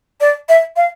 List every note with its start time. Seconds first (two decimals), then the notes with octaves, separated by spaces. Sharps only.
0.21 D5
0.49 E5
0.76 F5